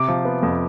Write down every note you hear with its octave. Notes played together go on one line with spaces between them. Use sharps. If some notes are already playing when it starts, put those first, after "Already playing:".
Already playing: C3 D6
F3
B3
F2